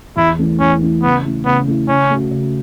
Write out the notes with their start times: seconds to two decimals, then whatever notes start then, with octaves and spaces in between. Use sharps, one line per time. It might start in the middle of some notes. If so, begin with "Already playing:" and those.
0.17 E2 E4
0.39 E3 A3 E4
0.60 E2 C#4
0.81 E3 A3 E4
1.03 C#3 B3
1.25 A3 E4
1.46 C#3 B3
1.67 A3 E4
1.88 C#3 C#4
2.11 A3 F#4
2.31 C#3